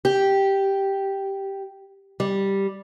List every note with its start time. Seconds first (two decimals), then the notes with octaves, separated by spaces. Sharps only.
0.05 G4
2.20 G3